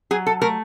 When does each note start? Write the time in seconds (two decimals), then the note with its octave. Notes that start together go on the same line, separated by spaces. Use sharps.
0.11 F#3 G#4
0.26 A4
0.42 A3 A#4